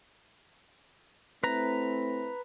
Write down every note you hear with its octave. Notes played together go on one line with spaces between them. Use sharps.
A3 C4 E4 B4 A#5